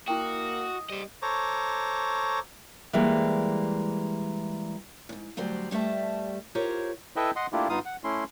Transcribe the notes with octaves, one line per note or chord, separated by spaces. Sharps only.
A#3 E4 F#4 D#5 G5
G3 C5 D#5
A4 C5 C#5 A#5 C#6 D6
E3 G3 G#3 A#3
E2 G#2
D2 F#3 G3 C5 D5
G2 G3 A3 E5 A5
F4 G4 A#4 C5 C#5
E4 A4 B4 D#5 E5 G5
D#5 F#5 C6
A3 A#3 D4 E4 F4 G4
G2 B3 D#4 F4 F5 D#6
F#5
A3 C#4 E4 C6